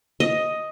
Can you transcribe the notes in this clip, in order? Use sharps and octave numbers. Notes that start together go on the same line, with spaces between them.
D#5